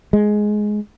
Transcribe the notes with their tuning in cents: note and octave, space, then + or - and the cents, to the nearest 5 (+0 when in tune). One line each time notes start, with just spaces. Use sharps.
G#3 +10